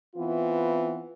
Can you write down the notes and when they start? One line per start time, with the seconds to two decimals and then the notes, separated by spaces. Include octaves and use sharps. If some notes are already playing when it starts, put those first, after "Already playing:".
0.16 E3 B3 C4 E4 F4